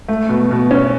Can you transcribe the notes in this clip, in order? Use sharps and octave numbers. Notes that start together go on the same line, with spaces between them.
A3
B2
B2
C#4